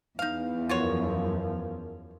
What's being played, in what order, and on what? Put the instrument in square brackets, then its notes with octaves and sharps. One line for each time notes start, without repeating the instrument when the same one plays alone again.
[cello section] E2 [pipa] D#4 F5
[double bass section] F#2 F3 [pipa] F4 F#4 C#5 [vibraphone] A#4 B4 F5